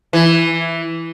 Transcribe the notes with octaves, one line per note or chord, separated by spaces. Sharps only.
E3